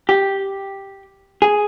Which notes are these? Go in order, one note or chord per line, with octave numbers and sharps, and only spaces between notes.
G4
G#4